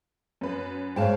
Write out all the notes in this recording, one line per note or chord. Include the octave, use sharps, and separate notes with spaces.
F#2 B4
G#2 C#5 F5 G5 A5